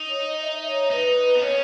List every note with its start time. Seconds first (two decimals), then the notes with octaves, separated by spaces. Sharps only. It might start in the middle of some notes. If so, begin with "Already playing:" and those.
Already playing: D#4
0.09 C#5
0.25 D#5
0.41 E5
0.67 C#5
0.91 D#4 B4
1.36 B3
1.41 C#4 C#5